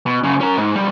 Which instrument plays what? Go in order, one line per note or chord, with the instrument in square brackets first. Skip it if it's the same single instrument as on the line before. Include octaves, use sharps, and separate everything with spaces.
[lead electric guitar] B2
F#2 C#3
C#4 A#4
G#2
B1 G3